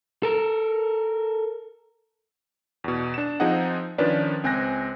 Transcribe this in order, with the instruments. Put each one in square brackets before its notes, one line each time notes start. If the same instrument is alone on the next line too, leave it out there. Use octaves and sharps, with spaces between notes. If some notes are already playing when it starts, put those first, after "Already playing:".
[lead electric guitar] A4 A#4
[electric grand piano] E2 B2
D4 E7
F3 C4 D#4 G#4 D#5 F#5
D#3 F3 C#4 D4 B4 D5
C#2 C4 G#5 F#6 A#6